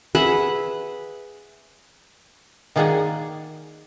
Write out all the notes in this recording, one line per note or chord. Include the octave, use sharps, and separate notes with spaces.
G#4 B4 E5 F#5
D#3 A#3 G#4 D5 F#5 G#5